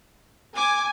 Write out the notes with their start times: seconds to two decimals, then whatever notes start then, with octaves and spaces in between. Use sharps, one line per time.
0.56 G#5 D6